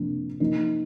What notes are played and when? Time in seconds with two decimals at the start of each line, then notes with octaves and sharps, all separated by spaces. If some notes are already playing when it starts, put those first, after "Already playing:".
Already playing: C3 F3 A#3 D4
0.40 F3 A#3 D#4